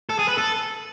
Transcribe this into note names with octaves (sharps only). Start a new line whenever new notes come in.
A4
G#4
B4
A4